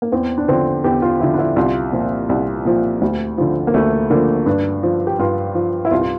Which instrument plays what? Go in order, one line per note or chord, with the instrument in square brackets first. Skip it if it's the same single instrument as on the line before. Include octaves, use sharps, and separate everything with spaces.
[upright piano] A#3
E2 C4
D4
D3 F3 C4
E2 G4
F4
D3 F3 E4
D4
E4
C2 F4
A#2 F3
C2
A#2 F3
D2
D3 F3
A#3
D2 A3
D3 F3 A#3
G2 D4
F3
G4
G2 F4
F3
E4
C2 F4
F4